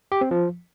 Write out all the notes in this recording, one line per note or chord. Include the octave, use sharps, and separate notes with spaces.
G4
C4
F3